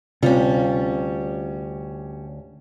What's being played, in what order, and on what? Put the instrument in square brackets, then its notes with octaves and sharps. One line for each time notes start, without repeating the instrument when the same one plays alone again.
[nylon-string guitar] D2 F4 [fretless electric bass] C3 [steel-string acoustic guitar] G3 C#4